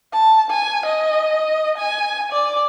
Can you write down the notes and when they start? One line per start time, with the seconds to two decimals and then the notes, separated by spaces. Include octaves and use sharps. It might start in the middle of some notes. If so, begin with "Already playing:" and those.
0.12 A5
0.51 G#5
0.86 D#5
1.78 G#5
2.33 D5